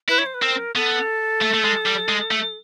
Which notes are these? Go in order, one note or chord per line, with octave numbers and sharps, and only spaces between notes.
E4 B4
C#5
C5
B4
C4 A#4
B3 A4
A3
A3
G#3
G3
G#3
A3